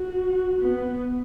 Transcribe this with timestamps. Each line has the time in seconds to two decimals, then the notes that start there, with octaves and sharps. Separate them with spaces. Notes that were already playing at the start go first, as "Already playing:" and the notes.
Already playing: F#4
0.61 B3